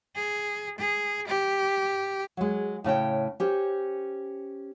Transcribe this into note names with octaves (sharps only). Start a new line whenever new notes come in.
G#4
G#4
G4
F#3 G#3
A2 C#3 C#5 G5
C#4 G4 C5